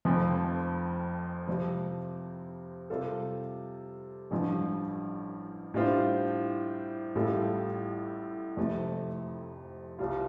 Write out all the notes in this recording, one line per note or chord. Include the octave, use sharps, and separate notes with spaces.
F1 F2 F3 C4
C3 F3 C4
C3 G3 F4 A4
A1 G2 F3
A2 G3 D4 F4 C5
A1 A2 G3 F4 A4
F1 F2 C3 A3
C2 C3 G3 F4